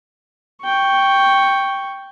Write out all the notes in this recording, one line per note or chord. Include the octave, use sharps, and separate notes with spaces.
G5 C#6